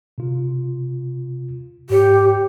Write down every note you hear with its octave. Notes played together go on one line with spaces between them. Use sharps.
C3 F4
G#2 G4 C#5 C#7